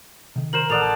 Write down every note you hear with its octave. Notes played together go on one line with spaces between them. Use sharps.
C3 D#3
A#4 C5 E7 F#7
A1 A4 D5 F#5 D#6 F7
A5